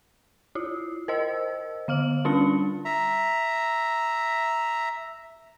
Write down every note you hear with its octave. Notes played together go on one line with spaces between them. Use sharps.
E4 F4
A#4 C5 D#5 E6
D3 F5 F6 F#7
G3 C#4 D4 F4 A5 C#7
E5 A#5